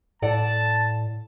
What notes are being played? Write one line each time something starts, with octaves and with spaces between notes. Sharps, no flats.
A2 A4 D5 F#5 A5